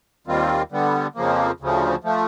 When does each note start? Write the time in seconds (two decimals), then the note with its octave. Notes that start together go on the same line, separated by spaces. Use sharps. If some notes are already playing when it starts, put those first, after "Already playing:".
0.27 D#2 D#3 G3 C4 F4
0.72 D3 G3 B3
1.15 F2 C#3 F3 A#3
1.60 D2 C#3 F3
2.04 F3 A3